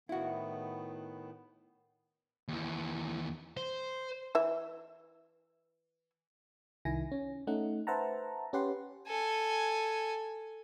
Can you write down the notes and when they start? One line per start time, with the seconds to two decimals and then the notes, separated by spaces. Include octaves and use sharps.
0.09 A2 D#3 B3 E4 F#4
2.48 D#2 E3
3.57 C5
4.35 E3 E5
6.85 C2 D#3 E4 G#5 A#6
7.12 C#4
7.47 A3 C#4 D#4 F#5
7.87 B4 C5 E5 F#5 A5 A#5
8.53 C#4 G4 B4 F#5 C6
9.08 A4 G#5